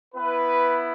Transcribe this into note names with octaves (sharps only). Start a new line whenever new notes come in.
B3 E4 B4